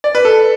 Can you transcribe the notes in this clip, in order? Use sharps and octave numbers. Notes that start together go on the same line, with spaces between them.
D5
B4
A4